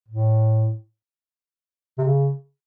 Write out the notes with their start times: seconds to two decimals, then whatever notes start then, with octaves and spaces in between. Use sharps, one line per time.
0.08 A2
1.98 C3
2.04 C#3